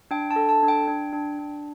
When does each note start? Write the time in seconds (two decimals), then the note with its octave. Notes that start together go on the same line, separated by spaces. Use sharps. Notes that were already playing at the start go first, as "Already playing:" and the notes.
0.11 D4 G5
0.31 A5
0.36 A4
0.49 A5
0.63 D4
0.68 G5
0.88 D4
1.13 D4
1.39 D4